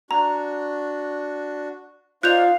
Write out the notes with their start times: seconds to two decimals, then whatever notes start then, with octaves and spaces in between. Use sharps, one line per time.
0.11 D4 F#4 A#5
2.23 D#4 F4 C5 D5 F5 F#6 G6 F7